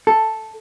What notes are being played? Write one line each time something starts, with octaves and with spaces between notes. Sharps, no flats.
A4